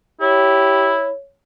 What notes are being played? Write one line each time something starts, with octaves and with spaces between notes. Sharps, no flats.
E4 G4 C#5